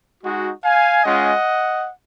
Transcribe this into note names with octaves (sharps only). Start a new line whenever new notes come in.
G#3 D#4 F#4
F5 G#5
G#3 C#4 F4 D#5 F#5